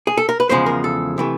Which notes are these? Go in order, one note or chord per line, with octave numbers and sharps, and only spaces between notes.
G#4
A4
A#4
B4
E2 C#3 F3 G#3 C5
A#4
A4
C3 E3 A3